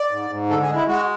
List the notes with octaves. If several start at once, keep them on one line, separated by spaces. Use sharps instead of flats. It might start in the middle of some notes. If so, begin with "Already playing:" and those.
Already playing: D5
G#2
G#2
D3 A4
G#4
G#3
E4
G#3 F#4